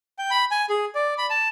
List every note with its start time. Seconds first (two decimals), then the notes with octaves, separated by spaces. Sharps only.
0.19 G5
0.31 B5
0.51 G#5
0.69 G#4
0.95 D5
1.18 B5
1.30 A5